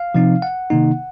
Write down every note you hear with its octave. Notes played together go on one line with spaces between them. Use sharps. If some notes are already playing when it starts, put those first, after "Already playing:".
Already playing: F5
C3 F3 C4 D#4
F#5
C3 D#3 A#3 D#4